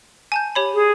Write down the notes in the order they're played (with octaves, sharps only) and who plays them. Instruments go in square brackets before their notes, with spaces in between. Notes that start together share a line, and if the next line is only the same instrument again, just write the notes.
[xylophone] G#5 A5 G6
G4 C#5 B5
[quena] G#4